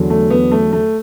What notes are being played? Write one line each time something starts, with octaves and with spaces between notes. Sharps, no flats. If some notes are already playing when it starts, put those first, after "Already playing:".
Already playing: E2 D3 F#3
A3
B3
A3
A3